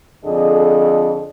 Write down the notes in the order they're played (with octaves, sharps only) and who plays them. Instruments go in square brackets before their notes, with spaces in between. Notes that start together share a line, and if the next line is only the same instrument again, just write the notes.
[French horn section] F2 D3 G#4 D#5